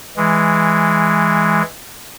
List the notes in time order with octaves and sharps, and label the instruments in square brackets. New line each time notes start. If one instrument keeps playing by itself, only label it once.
[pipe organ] E3 G#3